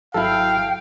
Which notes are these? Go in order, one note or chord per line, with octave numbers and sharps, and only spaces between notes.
G#1 F#3 E4 A4 F5 G5